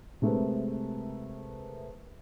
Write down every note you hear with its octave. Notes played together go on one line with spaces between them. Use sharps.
C3 G#3 A3 C4 A#4 B4